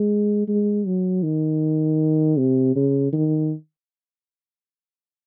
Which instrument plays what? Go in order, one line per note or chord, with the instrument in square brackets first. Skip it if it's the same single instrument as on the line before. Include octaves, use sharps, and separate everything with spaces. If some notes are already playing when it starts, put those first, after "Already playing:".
Already playing: [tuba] G#3
G#3
F#3
D#3
C3
C#3
D#3